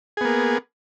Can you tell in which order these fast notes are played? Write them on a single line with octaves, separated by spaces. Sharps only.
G#4 B3 A#3